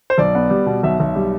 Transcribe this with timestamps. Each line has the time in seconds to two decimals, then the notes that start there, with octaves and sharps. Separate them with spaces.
0.10 C5
0.18 B1 D5
0.35 B3
0.50 G3
0.66 B2
0.83 B1 E5
1.00 B1
1.15 G3